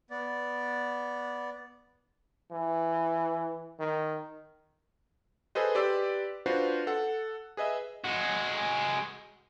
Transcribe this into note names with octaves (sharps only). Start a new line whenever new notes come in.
B3 D5
E3
D#3
G#4 A4 B4 C5 D#5
G4 B4 D5 C6 E6
D4 F4 F#4 B4 C5
A4 F#5
G#4 B4 D#5 E5
G#3 F#4